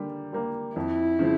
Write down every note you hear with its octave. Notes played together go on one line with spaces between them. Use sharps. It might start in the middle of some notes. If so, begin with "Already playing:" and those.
Already playing: D3 G3 A#3
G3 A#3
F2 E4
C#3 F3